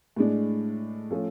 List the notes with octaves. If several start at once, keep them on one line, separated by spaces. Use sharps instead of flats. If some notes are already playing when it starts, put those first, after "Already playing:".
A2 G#3 D4
F3 A3 C#4 F4 A4